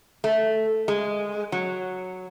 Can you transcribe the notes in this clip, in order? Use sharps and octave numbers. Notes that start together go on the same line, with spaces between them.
A3
G#3
F#3